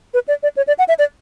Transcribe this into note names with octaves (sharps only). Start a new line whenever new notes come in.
B4
D5
D5
C#5
D5
F#5
E5
D5